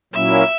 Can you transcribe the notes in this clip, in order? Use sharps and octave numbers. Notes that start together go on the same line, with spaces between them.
A#2 F#3 A#3 C#4 E4 E5